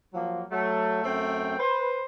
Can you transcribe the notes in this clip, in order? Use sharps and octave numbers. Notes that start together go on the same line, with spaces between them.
F3 F#3 A#3
F#3 A3
F#2 A3 C4 G5
B4 C5